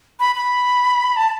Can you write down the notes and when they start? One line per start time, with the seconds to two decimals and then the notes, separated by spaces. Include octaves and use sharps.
0.20 B5
0.35 B5
1.16 A5